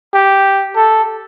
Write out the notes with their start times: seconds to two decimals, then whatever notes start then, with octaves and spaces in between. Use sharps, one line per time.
0.14 G4
0.75 A4